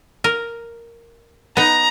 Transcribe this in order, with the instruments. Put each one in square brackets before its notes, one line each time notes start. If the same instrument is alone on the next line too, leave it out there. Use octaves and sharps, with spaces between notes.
[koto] A#4
[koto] B3 D#4 [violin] A#5